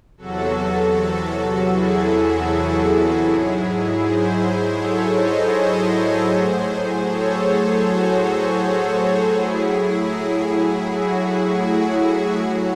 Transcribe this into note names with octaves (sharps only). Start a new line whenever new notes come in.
E2 C3 F#3 F#4 A4
E4 G#4
G#2 F#3
G#4 C5
A4 C#5
C5 D#5
G#4 C5
A2 F#3
A4 C#5
F#4 A4
A2 F#3 E4 G#4
F#4
F#4
A2 F#3